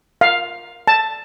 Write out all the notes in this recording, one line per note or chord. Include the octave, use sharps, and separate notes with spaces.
F5
A5